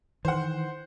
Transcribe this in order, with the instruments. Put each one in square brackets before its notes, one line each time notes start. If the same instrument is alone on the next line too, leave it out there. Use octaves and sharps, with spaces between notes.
[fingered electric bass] D#3 E3 [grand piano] C5 F#5